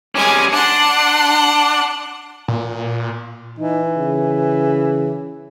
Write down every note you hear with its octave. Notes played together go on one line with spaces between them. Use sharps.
G3 G#3 C#4 G#5
D4 F#5 C6
A#2
E3 D#4
C#3